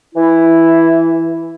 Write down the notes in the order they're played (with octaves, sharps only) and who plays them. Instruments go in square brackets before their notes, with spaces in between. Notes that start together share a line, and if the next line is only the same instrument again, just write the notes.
[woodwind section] E3 E4